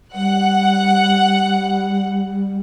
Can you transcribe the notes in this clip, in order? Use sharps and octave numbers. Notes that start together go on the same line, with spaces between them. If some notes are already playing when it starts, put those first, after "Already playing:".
G3 F#5